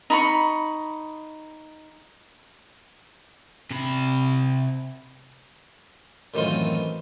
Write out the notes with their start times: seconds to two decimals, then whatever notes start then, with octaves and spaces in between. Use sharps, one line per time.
0.10 D#4 B5 C#6
3.70 C3 B5
6.34 F#2 A2 D#3 E3 C4 F4